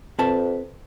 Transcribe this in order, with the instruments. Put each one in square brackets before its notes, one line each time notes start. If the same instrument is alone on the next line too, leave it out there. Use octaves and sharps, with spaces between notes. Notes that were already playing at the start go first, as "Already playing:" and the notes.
[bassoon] F2 [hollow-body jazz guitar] C4 B4 A5